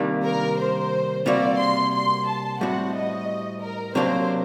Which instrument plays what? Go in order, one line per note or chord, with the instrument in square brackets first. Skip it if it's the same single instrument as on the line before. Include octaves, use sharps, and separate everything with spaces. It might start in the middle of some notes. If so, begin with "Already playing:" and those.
Already playing: [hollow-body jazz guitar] C3 D#3 G3 A#3 D4
[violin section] A#4
C5
[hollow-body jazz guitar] C3 G3 A#3 F#4 [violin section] D5
[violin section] C6
C6
A5
[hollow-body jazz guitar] A2 G3 C4 F#4 [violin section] F#5
[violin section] D#5
A#4
[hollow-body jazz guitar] C3 F#3 A#3 D4 G4 [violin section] C5